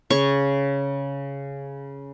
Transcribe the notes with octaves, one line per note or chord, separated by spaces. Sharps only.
C#3 C#5 C#6